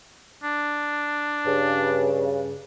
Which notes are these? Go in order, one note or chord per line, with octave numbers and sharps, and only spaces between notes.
D4
G2 C#3